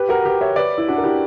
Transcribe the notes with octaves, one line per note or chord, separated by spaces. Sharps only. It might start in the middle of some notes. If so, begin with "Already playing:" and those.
Already playing: G4 B4
F#4 A#4
G4 B4
C#5 E5
B4 D5
E4
D4 F#4
A#4
E4 G4